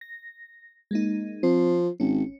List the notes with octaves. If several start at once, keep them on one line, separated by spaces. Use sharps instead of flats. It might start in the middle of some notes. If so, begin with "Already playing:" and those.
A#6
G#3 A#3 D#4
F3 C4
G#1 C#4